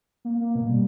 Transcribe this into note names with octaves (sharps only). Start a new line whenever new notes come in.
A#3
A#3
B2
G3